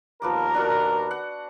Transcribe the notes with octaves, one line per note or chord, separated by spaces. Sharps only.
D#2 F3 B3 A#4 D6
D4 F#4 F#5
F#5